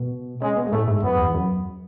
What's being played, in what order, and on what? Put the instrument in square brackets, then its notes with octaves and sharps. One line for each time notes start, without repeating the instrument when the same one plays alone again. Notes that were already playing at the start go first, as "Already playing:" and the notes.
Already playing: [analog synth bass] B2
[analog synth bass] C#3 [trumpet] G#3
[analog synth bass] B2
G#2
[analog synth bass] A2 [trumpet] A3
[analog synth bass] G#2
[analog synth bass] F#2 [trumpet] B3
[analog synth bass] E2
F#2